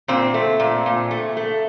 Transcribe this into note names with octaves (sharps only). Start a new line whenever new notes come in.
A#2 C4
A3
A#2
A#2
A3
A3